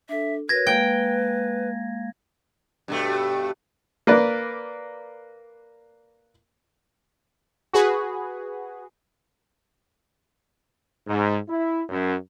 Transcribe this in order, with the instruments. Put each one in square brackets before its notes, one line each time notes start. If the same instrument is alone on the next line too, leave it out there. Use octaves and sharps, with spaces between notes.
[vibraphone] D4 A4 [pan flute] E5
[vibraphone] F#4 A#4 C#5 [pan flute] B4 [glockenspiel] G#6 A#6
[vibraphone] G#3 A#3 F5 [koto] G5
[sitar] G2 B2 A3
[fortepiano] A#3 B4 D5
[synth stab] F#4 G#4 B4
[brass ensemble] G#2
E4
F#2